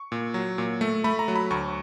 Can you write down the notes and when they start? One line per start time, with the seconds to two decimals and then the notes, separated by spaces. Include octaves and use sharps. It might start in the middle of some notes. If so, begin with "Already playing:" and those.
Already playing: C#6
0.12 A#2
0.34 F#3
0.58 A#2
0.81 A3
1.04 A3 B5
1.19 A#5
1.28 F#3
1.36 B5
1.50 D2 C#6